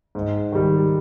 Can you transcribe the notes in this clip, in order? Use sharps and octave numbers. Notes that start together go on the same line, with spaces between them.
G#2
D#3 G3